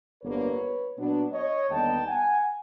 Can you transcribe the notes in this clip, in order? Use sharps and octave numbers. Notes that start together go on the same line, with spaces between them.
G1 F2 D3 G3 A#3 B4 C#5
A#2 F#3 B3 D4
C#5 D#5
D#2 D3 G3 B3 D#4 G5 A5
F#5 G#5